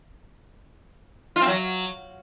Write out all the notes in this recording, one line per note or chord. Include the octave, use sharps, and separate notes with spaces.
F4
C4
F#3